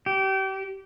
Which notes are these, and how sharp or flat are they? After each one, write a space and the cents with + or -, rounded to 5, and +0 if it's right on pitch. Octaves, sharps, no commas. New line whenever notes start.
G4 -30